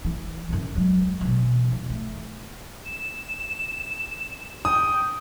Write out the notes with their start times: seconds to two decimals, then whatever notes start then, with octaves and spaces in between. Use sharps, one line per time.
0.05 E3
0.49 F#2 C#3
0.75 F#3 G#3
1.21 B2 E3
1.72 E2
1.90 A3
2.85 E7
4.65 G5 D#6